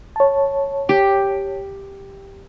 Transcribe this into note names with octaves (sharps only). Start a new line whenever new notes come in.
C#5 A5
G4